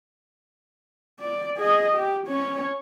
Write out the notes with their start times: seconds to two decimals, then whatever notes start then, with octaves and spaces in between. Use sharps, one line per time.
1.20 D5
1.58 G#4 D#5
1.95 G4
2.27 C#4 C#5